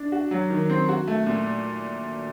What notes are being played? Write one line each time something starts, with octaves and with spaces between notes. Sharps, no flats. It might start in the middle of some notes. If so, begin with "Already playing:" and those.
Already playing: D4
F#4
F#3
D#3
C4
F#4
A3
A#2